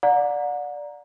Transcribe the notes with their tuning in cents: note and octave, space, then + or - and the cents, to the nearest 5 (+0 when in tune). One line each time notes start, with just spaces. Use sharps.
D5 -5 F#5 -35 A#5 +0